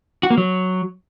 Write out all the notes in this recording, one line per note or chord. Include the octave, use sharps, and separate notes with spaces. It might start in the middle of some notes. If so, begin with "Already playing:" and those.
F#4
A#3
F#3